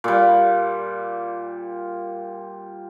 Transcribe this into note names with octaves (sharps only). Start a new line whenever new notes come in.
A#2 G3